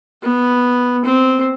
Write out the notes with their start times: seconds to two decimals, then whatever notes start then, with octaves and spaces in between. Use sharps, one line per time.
0.23 B3
1.05 C4